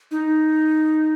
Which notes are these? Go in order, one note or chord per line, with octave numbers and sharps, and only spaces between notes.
D#4